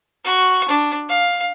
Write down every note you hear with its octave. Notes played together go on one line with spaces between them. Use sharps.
F#4 C#6
D4
F5